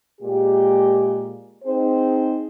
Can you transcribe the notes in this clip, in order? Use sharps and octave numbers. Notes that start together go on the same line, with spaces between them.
A#2 G#3 G4
C4 D#4 G#4 C5